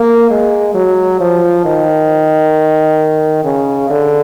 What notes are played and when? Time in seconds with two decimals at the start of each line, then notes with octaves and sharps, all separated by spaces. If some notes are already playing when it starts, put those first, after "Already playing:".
Already playing: A#3
0.30 G#3
0.74 F#3
1.20 F3
1.65 D#3
3.44 C#3
3.90 D3